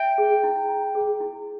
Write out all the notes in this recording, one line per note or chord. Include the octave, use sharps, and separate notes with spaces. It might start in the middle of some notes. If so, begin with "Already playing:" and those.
Already playing: E5 G5
G#4
E4
A#5
G#4
E4